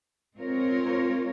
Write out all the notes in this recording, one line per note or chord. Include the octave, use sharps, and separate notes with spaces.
G#3 C4 F4 A#4 C#5